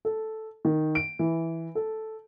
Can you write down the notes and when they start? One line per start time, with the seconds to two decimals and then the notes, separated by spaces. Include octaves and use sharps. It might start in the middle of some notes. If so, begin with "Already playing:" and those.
0.05 A4
0.65 D#3
0.95 D7
1.19 E3
1.75 A4